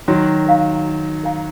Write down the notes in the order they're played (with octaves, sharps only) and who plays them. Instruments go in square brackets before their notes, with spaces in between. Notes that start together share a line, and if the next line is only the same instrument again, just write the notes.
[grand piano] D#3 F#3 [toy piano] F#4
[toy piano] A#4 F5 A#5
F#4
A#4 F5 A#5